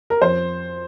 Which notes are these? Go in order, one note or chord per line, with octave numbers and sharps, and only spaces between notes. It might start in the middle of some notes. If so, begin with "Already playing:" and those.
A#4
F2 C5